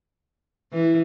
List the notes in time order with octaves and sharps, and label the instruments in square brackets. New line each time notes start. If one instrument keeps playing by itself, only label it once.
[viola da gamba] E3